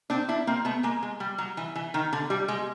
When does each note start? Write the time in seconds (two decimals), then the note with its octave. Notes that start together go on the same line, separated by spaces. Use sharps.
0.10 C4 D4
0.29 D4 E4
0.47 A#3 C4
0.65 A3 B3
0.83 G#3 A#3
1.03 G#3
1.20 G3
1.38 F#3
1.57 E3
1.76 E3
1.94 D#3
2.13 D3
2.30 G3
2.48 G#3